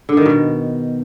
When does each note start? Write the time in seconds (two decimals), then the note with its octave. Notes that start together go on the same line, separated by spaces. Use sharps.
0.09 D3
0.17 D#3
0.25 B2